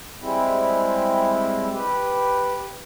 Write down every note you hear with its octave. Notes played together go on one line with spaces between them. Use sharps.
G3 G#3 C4 E4
G4 B4